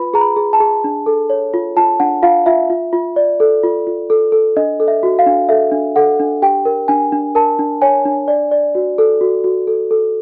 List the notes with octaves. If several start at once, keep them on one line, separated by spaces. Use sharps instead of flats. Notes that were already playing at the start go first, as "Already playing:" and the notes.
Already playing: F4 B4 B5
G#4 A#5
B5
G#4
A5
G#4
D4
A4
C#5
F4
F4 A5
D4 F#5
F4 F5
F4 E5
F4
F4
D5
A4
F4
F4
A4
A4
D4 D#5
A4
E5
F#4
F5
D4
A4 E5
D4
A4 F#5
D4
G4 G5
A#4
D4 G#5
D4
A#4 A5
D4
C#5 G#5
D4
D5
D5
F#4
A4
F#4
F#4
A4
A4